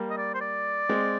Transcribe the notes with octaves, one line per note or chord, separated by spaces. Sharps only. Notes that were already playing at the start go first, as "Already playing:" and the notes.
Already playing: G3 A#3
D#5
D5
C5
D5
G#3 C4